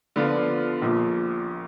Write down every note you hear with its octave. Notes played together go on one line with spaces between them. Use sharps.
D3 F3 B3 F4
A#1 A#2 F3